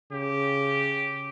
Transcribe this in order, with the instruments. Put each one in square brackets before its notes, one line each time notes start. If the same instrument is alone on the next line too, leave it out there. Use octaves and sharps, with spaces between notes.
[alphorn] C#3 [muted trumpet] G4